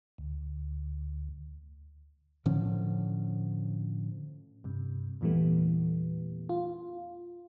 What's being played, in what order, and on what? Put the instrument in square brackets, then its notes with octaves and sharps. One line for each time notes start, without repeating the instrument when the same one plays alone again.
[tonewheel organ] D2
[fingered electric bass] A2 D3 F3 C#4
[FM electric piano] G2 C3
E2 A#2 E3 G3 A3 B3
F4